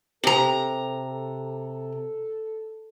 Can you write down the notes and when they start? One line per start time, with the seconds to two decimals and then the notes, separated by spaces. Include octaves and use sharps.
0.24 C3 A4 A#5